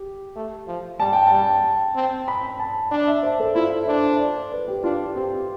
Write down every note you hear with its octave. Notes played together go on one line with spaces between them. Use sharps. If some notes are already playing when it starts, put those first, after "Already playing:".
Already playing: G4
A3
F3
G3 A5
G5
G3 A5
C4
B5
A5
D4 A5
D5
E5
C5
A4
E4 F4
D4 C5
D5
D5
B4
G4
D4 F4
C4 G4